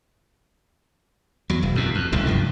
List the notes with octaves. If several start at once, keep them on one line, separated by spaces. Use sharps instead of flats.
E2 F#3
E1
E2 B2
F2
D1 C2 A2 C#3
F1 G2 F3